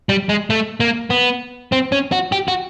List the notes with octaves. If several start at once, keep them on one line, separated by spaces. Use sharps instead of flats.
G3
G#3
A3
A#3
B3
C4
C#4
F#4
G4
F#4